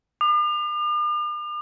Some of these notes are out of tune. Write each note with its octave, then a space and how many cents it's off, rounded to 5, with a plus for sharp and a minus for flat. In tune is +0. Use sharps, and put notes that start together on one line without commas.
D6 +45